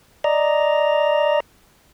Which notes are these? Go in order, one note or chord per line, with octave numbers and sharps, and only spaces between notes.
D5 D#5 A#5